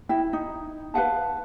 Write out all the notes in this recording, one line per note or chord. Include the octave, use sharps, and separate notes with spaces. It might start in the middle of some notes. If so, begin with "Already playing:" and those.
E4 G5
D#4
B4 F5 F#5 A5